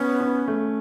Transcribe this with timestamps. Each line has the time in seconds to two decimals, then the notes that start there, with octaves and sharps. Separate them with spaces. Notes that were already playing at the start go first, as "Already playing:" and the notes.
Already playing: B3 C#4
0.21 C#4
0.48 A3